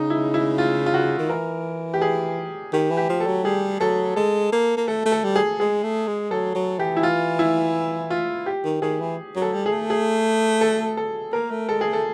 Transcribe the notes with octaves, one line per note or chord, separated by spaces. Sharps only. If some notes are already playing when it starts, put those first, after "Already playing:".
Already playing: C#3 D#4
E4
E4
F4
F4
F#4
D#3
E3 A#4
G4
G#4
D#3 G4
E3
G4
F3
A4
F#3
G3 G#4
F#3 A4
G#3 A4
A#3
A#3
A3 A4
A3
A4
G3
G#4
G#3 G#4
A3
G#3
F#3 A4
F#3
E3 G4
E4
F4
E4
F4
G4
D#3
D#3 G#4
E3
F#3
A4
G3
G#3 G#4
A3
G#4
A4
A4
A#3 A#4
A3
G#3 A4
G#4
A3
A4